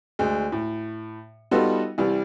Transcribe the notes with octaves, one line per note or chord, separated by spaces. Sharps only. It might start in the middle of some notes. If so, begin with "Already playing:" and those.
D2 G#3
A2
G3 B3 D#4 F4 F#4 A4
C2 E3 G3